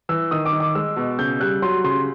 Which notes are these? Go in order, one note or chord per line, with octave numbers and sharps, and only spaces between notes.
E3 E6
D#3 D#6
D6
D#3
D6
G#3 E6
B2
C#3 G6
G3 F#6
F#3 C6
C#3 C6